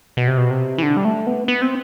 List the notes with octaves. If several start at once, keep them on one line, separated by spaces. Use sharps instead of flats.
B2
C3
B2
C3
E3
D3
G3
A3
B3
B3
C4